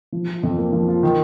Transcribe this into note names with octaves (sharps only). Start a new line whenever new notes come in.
F3
F4
F2
A#3
F3
F4
D#3